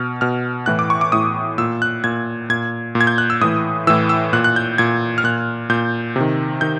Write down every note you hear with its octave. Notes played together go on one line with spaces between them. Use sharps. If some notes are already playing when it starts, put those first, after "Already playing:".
Already playing: B2 F6
B2 F6
A2 E3 F#6
D6
C#6
D6
A2 E3 D#6
A#2 E6
F#6
A#2 G#6
A#2 G#6
A#2
G#6
G6
F#6
E6
A2 E3 D#6
A2 E3 E6
E6
A#2 F#6
F#6
G6
A#2 G#6
F6
A#2 F#6
A#2 G6
C3 D#3
D#3 G6